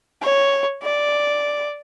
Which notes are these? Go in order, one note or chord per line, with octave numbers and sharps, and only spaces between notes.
C#5
D5